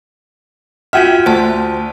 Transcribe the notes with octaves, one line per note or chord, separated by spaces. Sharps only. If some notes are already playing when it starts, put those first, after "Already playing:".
F4 F#4 E5 F#5 G5 F6
D2 C5 A5